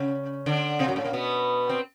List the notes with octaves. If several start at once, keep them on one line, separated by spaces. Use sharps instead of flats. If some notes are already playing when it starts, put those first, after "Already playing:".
Already playing: C#3 C#4
D3 D4
C3 C4
F#2 F#3
A2 A3
A#2 A#3
B2 B3
C4